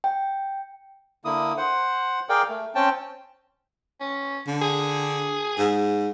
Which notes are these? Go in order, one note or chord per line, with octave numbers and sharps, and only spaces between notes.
G5
D3 A#3 E4 D#6
C5 F#5
G#4 A#4 D5 F5 G5
A3
C4 C#4 G5 A5
C#4
D3
G#4
G#2